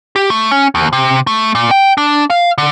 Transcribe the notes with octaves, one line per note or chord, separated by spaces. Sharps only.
G4
A3
C#4
D#2
C3
A3
A#2
G5
D4
F5
D3